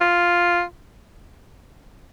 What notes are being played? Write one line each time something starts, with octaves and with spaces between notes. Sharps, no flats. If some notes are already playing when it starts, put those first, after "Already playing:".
F4